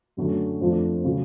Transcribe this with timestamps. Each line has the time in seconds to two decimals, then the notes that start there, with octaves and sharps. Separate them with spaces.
0.17 F#2 D3 F#3 A3 C#4
0.61 F2 F3 A3 D4
1.04 C#3 F#3